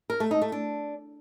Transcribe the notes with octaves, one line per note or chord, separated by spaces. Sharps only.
A#4
A3
D#4
A3
D4